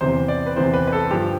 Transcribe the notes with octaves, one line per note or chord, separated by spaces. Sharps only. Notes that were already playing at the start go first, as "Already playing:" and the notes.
E2 C3 E3 C5
D5
B4
E2 C3 E3 C5
B4
B4
A4
G2 F3 G4